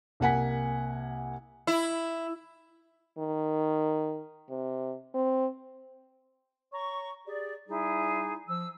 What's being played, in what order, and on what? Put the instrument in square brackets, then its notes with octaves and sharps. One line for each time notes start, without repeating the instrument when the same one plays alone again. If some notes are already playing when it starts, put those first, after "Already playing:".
[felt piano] C2 A#3 F#5 G#5 B6
[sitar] E4
[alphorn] D#3
C3
C4
[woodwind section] C#5 A#5 C#6
G4 G#4 D5
G3 D#4 E4 G#4
F3 E6